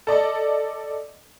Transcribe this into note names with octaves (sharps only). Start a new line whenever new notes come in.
A4 D5 D#5